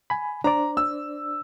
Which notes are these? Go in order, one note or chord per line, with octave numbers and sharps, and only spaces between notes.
G#5 B5
D4 C5 D5 A#5
E6